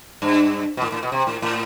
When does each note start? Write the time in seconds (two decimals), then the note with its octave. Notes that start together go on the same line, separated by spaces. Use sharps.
0.22 G2
0.77 B2
0.82 A2
0.92 A2
1.03 B2
1.12 C3
1.27 A2
1.42 A2